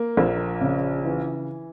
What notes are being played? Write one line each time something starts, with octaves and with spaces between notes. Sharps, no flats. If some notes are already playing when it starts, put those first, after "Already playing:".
Already playing: A#3
A#1
C#3
E3